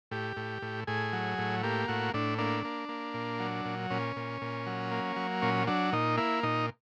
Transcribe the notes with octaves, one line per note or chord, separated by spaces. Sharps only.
A2 G4
A2
A2
A2 G#4
F#3
A2
A#3 G4
A2 F#4
A2 D4
A#3 D4
A#3
A#3
A#2
F#3
A#2
A#2 C#4
A#2
A#2
F#3
A#3
F#3
A#2 C#4
F#3 D4
A#2 D#4
A#3 E4
A#2 D#4